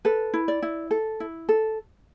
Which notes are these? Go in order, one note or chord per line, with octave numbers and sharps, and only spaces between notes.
A4 B4
E4
D5
E4
A4
E4
A4